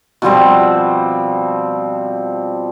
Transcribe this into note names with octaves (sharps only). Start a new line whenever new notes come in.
B2 F3 G3 C4